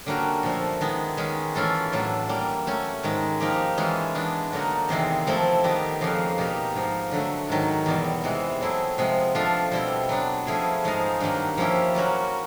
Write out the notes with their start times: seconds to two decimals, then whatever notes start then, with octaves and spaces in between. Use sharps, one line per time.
0.06 D3 G3 A#3 C#4 F#4
0.43 A#2 F3 A3
0.81 D#3 G#3 B3
1.17 D#3 G#3 C#4
1.55 E3 A3 C#4 F4 A4
1.92 A2 F#3 A3 D4
2.29 E3 G3 A#3
2.66 F#3 A3 C#4
3.03 G#2 D#3 G#3
3.40 F3 A#3 D#4 G4
3.78 E3 G#3 C#4 F4
4.15 E3 G#3 B3 D4
4.52 D3 F#3 A#3 D#4 F#4
4.89 E2 C3 D#3 G#3 C4
5.27 F3 A3 C4 E4 A4
5.64 D#3 G3 B3 D#4 G4
6.01 F2 C#3 F3 A#3
6.38 B2 G3 A#3 D#4 G4
6.75 G#2 F3 A#3
7.12 D3 F#3 A3
7.49 G#2 D#3 F#3
7.86 E2 B2 G3
8.24 C3 E3 G#3
8.61 F#3 A3 C4 E4 G#4
8.98 C3 F3 G#3 B3
9.35 F3 A3 D4 F4
9.72 B2 G3 C4 E4
10.09 F#3 B3 D4
10.47 F3 A3 C#4 E4 G#4
10.84 G#2 F3 G#3 B3 D#4
11.20 G2 D#3 F#3 A#3
11.57 F3 A#3 C#4 E4 G4
11.95 F#3 A#3 C#4 F#4